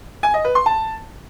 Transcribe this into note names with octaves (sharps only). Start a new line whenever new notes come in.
G#5
D#5
B4
C6
A5